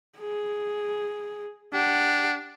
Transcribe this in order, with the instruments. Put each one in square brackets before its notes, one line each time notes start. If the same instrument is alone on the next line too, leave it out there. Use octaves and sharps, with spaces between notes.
[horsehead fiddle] G#4
[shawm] D4 [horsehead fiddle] G4 F#5